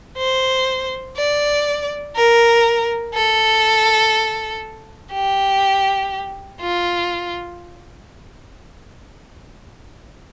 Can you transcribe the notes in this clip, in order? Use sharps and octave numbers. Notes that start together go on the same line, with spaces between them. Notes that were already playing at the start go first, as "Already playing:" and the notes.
C5
D5
A#4
A4
G4
F4